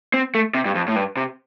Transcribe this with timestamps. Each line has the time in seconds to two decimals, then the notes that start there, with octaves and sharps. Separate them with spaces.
0.14 C4
0.35 A3
0.55 C3
0.65 G2
0.75 F2
0.88 A2
0.96 G2
1.17 C3